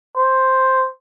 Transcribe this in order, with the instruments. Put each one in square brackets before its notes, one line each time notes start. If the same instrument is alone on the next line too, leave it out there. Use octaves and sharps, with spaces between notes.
[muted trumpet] C5